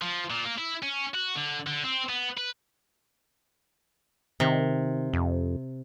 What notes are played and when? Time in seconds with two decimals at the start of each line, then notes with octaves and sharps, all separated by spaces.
0.02 F3
0.30 A#2
0.45 A#3
0.58 E4
0.82 C#4
1.14 F#4
1.35 D3
1.67 D3
1.84 C4
2.09 B3
2.38 B4
4.40 C3 D#3
5.13 F2